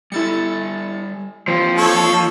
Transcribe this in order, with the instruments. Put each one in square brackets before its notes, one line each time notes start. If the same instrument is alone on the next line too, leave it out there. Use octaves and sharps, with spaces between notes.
[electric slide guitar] G3 G4 A4 [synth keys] E4 A6 C#7
[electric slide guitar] E3 A#3 G4 [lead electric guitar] F3 [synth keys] C4
[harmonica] A4 C#5